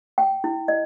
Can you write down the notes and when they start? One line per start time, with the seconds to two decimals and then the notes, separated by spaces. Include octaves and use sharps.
0.18 G5
0.44 E4
0.68 D#5